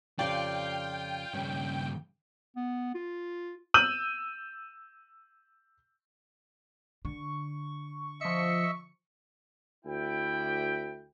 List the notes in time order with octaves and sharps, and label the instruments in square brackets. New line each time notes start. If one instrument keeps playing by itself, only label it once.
[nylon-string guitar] F2 C#3 G4 [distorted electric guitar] F4 [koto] D5 [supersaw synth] G5
[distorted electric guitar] G2 C#3 [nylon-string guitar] C#4
[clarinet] B3
F4
[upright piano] E6 G6 D#7 F#7
[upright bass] D3 [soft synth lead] C#6
[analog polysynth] F3 C#7 [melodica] D#5 E5 E6
[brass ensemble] D2 E4 G5